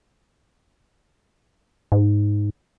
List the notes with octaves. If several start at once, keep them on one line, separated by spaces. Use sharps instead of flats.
G#2